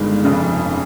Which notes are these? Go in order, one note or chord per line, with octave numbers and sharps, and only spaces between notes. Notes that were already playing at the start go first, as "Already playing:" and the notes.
Already playing: G1 G2 D#3 G#3
F1 F2 C#3